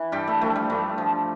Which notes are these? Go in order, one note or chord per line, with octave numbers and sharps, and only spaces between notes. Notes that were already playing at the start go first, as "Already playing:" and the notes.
Already playing: E3
G2 G3 G4
A3
F3 A3
G3
G2 A3
F3